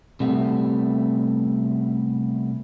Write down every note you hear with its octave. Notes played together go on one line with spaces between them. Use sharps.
C3 G3 A3 B3